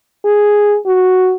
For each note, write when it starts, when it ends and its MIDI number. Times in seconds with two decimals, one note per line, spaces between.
0.25 0.77 68
0.86 1.36 66